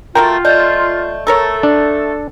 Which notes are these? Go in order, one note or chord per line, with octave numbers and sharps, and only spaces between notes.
A3 F4 F#4 A#4 G5
A3 D5 D#5 G6
A3 A4 A#4 C#5 E6
D4